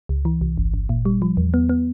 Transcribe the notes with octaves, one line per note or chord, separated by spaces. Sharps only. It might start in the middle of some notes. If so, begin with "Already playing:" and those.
C#2
E3
C2
G1
G1
A#2
G3
F3
E2
B3
B3